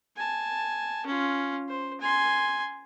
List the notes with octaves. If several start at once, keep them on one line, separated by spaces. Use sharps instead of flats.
G#5 A5
C#4 F4
C5
G#5 C6